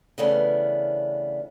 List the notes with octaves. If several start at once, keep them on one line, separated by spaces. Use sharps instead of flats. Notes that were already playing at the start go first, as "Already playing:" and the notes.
C#3 E3 A3 B3 C#4 D4